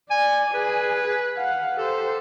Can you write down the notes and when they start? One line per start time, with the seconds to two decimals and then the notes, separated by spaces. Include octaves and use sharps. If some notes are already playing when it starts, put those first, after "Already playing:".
0.11 D5 G#5
0.54 G#4 B4 G#5
1.37 F5 F#5
1.77 G4 A4 C5